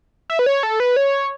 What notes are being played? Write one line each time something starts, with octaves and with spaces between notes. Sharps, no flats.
E5
B4
C#5
A4
B4
C#5